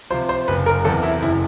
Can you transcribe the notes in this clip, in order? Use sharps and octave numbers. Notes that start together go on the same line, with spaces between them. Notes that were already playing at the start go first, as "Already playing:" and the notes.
C3 F3 C5
C5
F#1 B4
A#4
E2 C3 A4
E4
F#1 E4